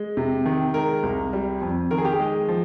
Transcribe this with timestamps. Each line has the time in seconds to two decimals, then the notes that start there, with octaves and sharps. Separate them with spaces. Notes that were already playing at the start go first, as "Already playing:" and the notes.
Already playing: G#3
0.17 C3
0.45 D#3
0.74 G#3 A#4
1.03 C2
1.33 G3
1.61 F2
1.91 D#3 A#4
1.98 G#4
2.05 G4
2.12 G#4
2.20 G#3
2.48 F3